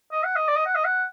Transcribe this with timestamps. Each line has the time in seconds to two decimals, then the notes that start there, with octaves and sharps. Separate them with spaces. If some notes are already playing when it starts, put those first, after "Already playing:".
0.12 D#5
0.24 F#5
0.36 D#5
0.48 D5
0.56 D#5
0.66 F#5
0.75 D#5
0.85 F#5